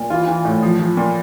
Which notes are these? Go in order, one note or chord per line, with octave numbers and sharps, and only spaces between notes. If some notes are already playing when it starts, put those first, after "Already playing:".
Already playing: A#2
E3 F4
E3
A2
F3
F3
A#2